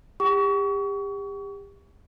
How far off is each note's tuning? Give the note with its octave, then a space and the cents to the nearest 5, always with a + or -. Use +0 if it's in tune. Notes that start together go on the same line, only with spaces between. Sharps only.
G4 +35 F#5 +45 C#6 +30